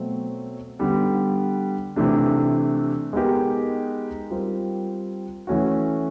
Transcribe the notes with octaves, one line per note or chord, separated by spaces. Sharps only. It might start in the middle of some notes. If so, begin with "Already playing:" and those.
Already playing: B2 F#3 A3 C4
D3 G3 B3
C3 E3 A3 D4
G#3 B3 D#4 G4 A#4
G3 C4 F4 A#4
E3 A3 C#4 F#4